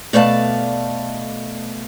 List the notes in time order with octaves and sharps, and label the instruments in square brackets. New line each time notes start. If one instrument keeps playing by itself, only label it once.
[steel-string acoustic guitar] B2 A3 D5 F5 A5